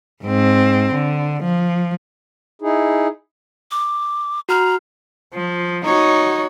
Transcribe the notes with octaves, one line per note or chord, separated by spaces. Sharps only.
G#2 C4
D3
F3
D#4 E4 G#4
D6
F#4 A#5 F6
F3
D#4 F#4 C#5